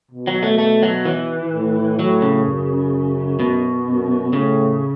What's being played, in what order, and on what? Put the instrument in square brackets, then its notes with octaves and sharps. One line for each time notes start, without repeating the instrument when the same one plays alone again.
[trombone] B2
[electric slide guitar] F#3
A3
A3
F#3
E3
[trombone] A2
[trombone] A2 [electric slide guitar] F#3
[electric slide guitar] C#3
[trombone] F#2
[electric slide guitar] B2
[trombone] F#2
[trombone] A2 [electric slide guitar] C#3